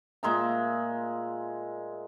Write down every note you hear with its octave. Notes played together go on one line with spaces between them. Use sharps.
A#2 G#3 E5 A#5